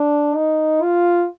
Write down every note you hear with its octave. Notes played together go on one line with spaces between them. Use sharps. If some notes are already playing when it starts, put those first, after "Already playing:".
Already playing: D4
D#4
F4